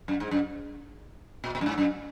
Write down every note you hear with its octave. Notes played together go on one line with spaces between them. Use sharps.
F#2
G#2
F#2
A#2
A#2
F#2
G#2
F#2